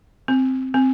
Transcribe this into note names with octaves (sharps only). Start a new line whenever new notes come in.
C4
C4